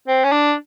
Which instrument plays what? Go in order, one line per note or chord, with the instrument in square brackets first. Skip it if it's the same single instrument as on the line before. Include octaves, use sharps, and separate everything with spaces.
[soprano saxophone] C4
C#4
D4